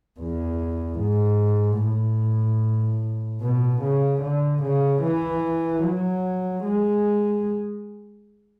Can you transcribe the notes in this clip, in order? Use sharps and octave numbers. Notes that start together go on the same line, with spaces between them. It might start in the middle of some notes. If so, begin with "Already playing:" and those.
E2
G#2
A2
B2
C#3
D3
C#3
E3
F#3
G#3